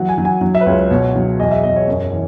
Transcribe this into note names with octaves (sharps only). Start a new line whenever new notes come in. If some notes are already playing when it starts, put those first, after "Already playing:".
Already playing: E3 F#3 F#5
G#5
F#3
G#5
F#3
E5
B4
C#2 C#5
B4
B2 C#5
F#3
E2 D#5
E5
E2 D#5
C#5
F#2 C#5
C#5
E3